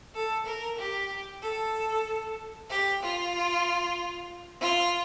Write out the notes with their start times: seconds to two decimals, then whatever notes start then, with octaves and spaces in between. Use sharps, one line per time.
0.14 A4
0.46 A#4
0.77 G4
1.42 A4
2.69 G4
3.01 F4
4.60 F4